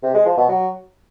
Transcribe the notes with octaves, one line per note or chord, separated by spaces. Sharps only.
C3
G#3
F3
B2
F#3